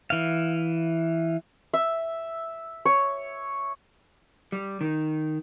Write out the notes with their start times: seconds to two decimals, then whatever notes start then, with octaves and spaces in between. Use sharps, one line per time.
0.10 E3 F5
1.74 E5
2.85 C#5
4.52 G3
4.81 D#3